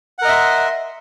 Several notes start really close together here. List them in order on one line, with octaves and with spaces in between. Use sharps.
F#5 A#4 D#5 E5 C6